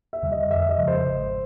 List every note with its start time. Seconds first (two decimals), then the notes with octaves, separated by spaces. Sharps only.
0.13 E5
0.22 D#2 D3 G3
0.32 D#5
0.50 F2 E5
0.69 D#5
0.78 C#3 F3 G#3
0.88 C5
1.07 G#1